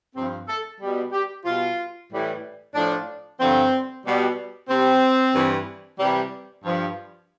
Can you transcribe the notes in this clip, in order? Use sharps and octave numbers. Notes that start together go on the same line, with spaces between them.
G2 F3 C4
A4
B2 G3
G4
B2 G3 F4
A2 E3 G3
A2 F3 D4
G2 D3 F3 C4
B2 G3
C3 G3 C4
G2 E3 G3
C3 E3 G3
G2 F3